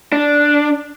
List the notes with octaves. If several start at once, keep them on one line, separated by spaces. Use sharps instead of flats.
D4